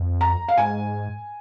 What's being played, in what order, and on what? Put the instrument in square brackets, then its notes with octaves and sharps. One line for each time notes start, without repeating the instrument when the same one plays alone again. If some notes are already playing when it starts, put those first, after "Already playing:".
Already playing: [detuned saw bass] F2
[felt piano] A#5
F5
[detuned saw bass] G#2 [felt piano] G#5